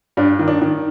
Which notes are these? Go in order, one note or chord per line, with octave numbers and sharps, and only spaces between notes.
G2 D4
D#3
D4
D#3